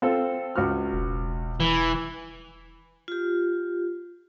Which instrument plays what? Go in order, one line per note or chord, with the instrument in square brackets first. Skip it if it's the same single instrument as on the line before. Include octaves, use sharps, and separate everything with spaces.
[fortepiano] C4 F4 A4
C#2 F#4 F6
[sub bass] E1
[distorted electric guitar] E3
[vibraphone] F4 G4